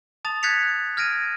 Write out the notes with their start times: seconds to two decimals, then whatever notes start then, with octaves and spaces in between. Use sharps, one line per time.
0.25 A5 D#6 A6 F7
0.43 F#6 G#6 A6 B6 C#7 F7
0.97 F6 G#6 A#6 D7 D#7